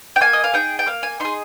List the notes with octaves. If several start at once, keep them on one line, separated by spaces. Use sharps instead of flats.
G5
A#3 G#5
D#5
F5
D#4 G#4 G5
G5
A#3 F5
G#5
D#4 G#4 C6